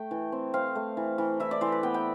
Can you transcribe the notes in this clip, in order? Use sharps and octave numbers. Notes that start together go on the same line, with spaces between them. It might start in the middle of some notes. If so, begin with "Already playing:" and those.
Already playing: A3 G5
E3
C4
C4 F5
A3
E3
E3
E3 E5
D5
E3 C5
B4
B3 G5
G5